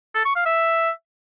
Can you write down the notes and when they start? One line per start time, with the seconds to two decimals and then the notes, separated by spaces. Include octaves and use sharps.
0.15 A4
0.25 C#6
0.36 F5
0.46 E5